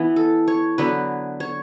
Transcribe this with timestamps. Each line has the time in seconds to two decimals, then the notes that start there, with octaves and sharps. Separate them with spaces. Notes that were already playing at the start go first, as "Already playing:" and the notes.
Already playing: E3 B3
0.16 A4
0.48 C#5
0.78 D3 F#3 B3 B4
1.40 C#5